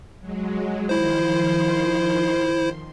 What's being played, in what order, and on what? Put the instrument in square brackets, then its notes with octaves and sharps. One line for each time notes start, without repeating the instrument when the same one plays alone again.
[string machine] F#3 G#3
[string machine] D#3 F3 C6 [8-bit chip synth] E4 C5